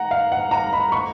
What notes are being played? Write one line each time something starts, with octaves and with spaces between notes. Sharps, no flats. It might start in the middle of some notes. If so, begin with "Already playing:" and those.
Already playing: F#5 A#5
F5
F#5
A#5
B5
C#6